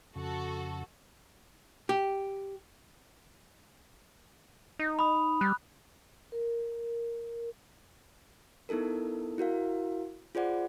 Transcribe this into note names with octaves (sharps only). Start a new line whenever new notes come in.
F2 C#3 F#4 A4
G4
D#4
B5 D#6
G3 F#6
A#4
B3 D#4 E4 A4 A#4
E4 F#4 A#4 F5
F4 G#4 C5 D5 F#5